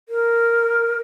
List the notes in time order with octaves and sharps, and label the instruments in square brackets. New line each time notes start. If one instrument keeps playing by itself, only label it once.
[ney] A#4